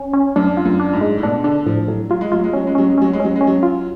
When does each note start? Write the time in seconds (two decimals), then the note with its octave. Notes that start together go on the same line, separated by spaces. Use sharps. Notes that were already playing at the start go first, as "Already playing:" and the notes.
Already playing: C#4
0.13 C#4
0.36 F#2 D4
0.57 F4
0.65 F#2
0.80 D4
0.93 G#2
1.01 G#3
1.18 A2
1.23 B2 D4
1.44 D3 D4
1.66 A2 F3
1.88 A2 F#3
2.10 F#3 F4
2.21 G#3
2.32 F#3 F4
2.44 G#3
2.53 F#3 C#4
2.67 G#3
2.75 F#3 C#4
2.90 G#3
2.98 F#3 C#4
3.13 G#3
3.20 C#4
3.25 F#3
3.36 G#3 C#4
3.47 F#3
3.63 F4